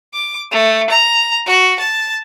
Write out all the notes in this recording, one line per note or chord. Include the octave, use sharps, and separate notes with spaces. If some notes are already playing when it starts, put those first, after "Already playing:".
D6
A3
A#5
F#4
A5